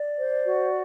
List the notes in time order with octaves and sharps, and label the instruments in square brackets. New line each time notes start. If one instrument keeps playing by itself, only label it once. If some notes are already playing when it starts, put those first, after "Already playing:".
Already playing: [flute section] D5
C5
F#4